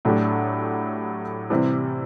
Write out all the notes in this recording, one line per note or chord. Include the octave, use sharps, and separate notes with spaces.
A2 F#3 A3 D4 G4
C3 E3 G3 C4 E4